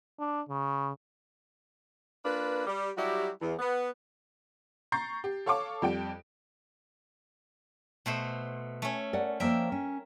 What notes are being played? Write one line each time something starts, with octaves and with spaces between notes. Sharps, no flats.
D4
C#3
A#3 D4 F4 B4
G3
F#3 G3 E4 F#4 G4
E2
B3
A#5 C#6 G6 A6 C7
G4
A4 C#5 F5 A5 C#6 D6
F2 G3 G5 D7
B2 A3 C5
A3 C#4
A#4 D5 F#5
F3 A#3 A#4 C5 E5 G5
C#4